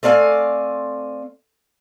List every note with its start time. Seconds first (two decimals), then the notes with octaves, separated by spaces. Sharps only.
0.03 A3 C4 D5 F5 G#5